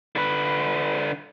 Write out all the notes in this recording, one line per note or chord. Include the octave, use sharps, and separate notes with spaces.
D3 B4